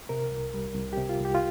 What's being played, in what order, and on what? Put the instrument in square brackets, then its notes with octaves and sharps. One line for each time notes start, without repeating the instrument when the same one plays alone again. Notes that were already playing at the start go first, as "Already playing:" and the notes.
[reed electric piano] C3 A#4
C2
G3
C2
G4
C3
F4
C2 G4
F4